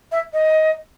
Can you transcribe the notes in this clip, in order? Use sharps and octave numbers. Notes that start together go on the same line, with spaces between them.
E5
D#5